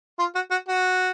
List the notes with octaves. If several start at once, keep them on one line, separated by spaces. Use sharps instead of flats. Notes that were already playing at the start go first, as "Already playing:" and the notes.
F4
F#4
F#4
F#4